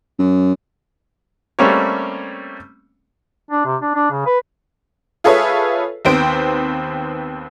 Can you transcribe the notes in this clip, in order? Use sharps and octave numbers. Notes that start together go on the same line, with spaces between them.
F#2
G3 A3 A#3 C4 C#4 C#5
D4
C3
D4
D4
C#3
B4
F4 G#4 A4 B4 C#5 E5
D#2 B3 C4 C5 D7